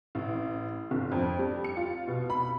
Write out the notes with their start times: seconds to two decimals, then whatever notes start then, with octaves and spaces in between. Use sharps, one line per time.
0.15 A1
0.91 G1
1.12 F2
1.39 G3
1.64 C#7
1.77 F4
2.08 B2
2.30 B5